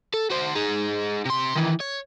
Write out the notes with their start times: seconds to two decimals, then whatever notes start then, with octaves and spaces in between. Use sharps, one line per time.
0.14 A4
0.30 F#4 C5
0.55 D#4 G#4
1.25 C3 C6
1.55 D#3 E3
1.80 C#5